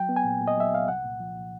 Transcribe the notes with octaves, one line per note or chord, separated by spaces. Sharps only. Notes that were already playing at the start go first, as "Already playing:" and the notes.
Already playing: F#3 G5
B3
G#5
A#2
A#2
D#5
F#3 E5
C2 F5
C2 F#5
A#2
F3
A#2